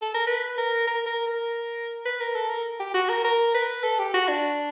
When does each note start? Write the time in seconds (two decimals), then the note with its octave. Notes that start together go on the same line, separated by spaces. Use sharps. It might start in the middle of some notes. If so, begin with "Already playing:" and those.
0.02 A4
0.14 A#4
0.27 B4
0.57 A#4
0.87 A#4
1.06 A#4
1.27 A#4
2.05 B4
2.20 A#4
2.35 A4
2.50 A#4
2.80 G4
2.94 F#4
3.09 A#4
3.24 A#4
3.54 B4
3.83 A4
3.99 G4
4.14 F#4
4.28 D4